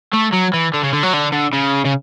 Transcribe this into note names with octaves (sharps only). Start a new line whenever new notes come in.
A3
F#3
E3
D3
C#3
D3
F#3
D3
D3
C#3
C#3